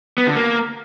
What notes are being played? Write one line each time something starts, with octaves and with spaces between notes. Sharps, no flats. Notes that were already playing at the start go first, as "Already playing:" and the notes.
B3
D3
A#3